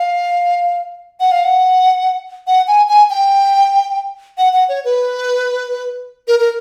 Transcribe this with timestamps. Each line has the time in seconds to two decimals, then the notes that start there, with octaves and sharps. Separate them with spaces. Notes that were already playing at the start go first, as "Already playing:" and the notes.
Already playing: F5
1.20 F#5
1.31 F5
1.44 F#5
2.47 F#5
2.68 G#5
2.89 G#5
3.10 G5
4.38 F#5
4.53 F#5
4.69 C#5
4.85 B4
6.28 A#4
6.39 A#4